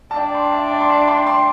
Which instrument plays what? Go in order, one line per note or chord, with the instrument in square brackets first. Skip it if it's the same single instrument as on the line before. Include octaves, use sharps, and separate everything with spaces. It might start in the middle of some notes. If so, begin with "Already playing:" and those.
[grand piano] A5
[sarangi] D4 [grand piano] D5 G5
[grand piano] G5 C6
E5 A5
D5 G5
C6
E5 A5
G5 C6
G5 C6